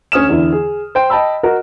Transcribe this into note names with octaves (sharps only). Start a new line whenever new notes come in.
D2 C#4 D#6 F6 E7
E2 D3 E4
G#4
C5 G5
D#5 G5 A5 B5 E6
F#4 A#4 D#5